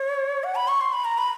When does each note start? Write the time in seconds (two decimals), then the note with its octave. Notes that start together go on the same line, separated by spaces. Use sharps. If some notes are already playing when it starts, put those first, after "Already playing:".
Already playing: C#5
0.44 F#5
0.55 B5
0.68 C#6
0.81 C6
0.93 B5
1.05 A#5
1.18 B5